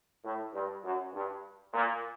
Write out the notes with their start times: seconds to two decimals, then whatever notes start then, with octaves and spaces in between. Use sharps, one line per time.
0.24 A2
0.54 G2
0.83 F#2
1.13 G2
1.73 A#2